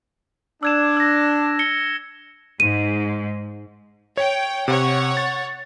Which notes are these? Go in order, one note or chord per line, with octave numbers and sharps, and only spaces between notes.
D4 E6 G#6 E7
E6 A#6
C#7 G7
G#2 D#7
C#5 G5
C3 C#5 F#5
A6